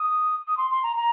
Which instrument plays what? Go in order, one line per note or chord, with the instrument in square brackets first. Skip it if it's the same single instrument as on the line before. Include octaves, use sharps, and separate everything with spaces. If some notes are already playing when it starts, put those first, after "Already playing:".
Already playing: [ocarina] D#6
D#6
C6
C6
A#5
A#5